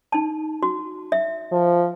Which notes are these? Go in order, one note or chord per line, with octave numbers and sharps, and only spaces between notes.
D#4 A5
F#4
E5
F3